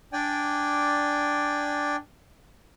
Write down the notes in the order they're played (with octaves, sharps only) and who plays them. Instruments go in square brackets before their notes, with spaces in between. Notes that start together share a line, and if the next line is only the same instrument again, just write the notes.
[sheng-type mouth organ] D4 D5 G5 G#5